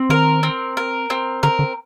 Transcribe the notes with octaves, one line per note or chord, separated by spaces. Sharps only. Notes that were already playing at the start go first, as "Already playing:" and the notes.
Already playing: C4
D#3 A#4
C4
A#4
C4
D3 A#4
D3